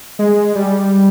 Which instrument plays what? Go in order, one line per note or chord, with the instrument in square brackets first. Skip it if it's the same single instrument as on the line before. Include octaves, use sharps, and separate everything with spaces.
[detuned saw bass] G#3
G3